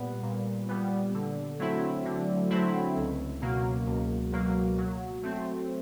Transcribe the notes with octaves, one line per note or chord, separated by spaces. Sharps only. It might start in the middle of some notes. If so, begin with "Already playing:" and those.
Already playing: A#2 G3 B3
A#2
G3 B3
D3
F#3 A3 C4 E4
D3
F#3 A3 C4 E4
C#2
B2 F#3 A#3
C#2
B2 F#3 A#3
F#3
A3 C4